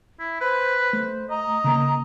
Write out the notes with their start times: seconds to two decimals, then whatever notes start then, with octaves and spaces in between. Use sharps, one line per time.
0.19 E4
0.41 B4 C5
0.93 A3 C5
1.30 D#5 A#5
1.64 C#3 A#3